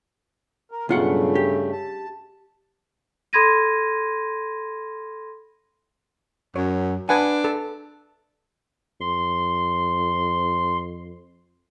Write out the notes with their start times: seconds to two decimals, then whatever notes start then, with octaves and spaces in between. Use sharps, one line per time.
0.71 A#4
0.89 B1 G2 C#3 A3 F4 F#5
1.35 G4
1.72 A5
3.33 A4 B5 C6 G#6 A#6 D#7
6.56 F#2 C#5
7.09 D4 B4 F#5 G#5
7.44 A4
9.01 F2 C6